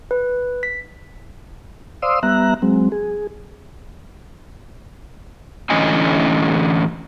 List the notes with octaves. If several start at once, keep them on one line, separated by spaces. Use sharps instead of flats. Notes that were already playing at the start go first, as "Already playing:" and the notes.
B4
B6
C5 D5 F5 C6 D#6 E6
G3 B3 E5 A#5 F#6
F#3 G#3 C4
G#4
A2 D3 E3 C#4 D#5 G#5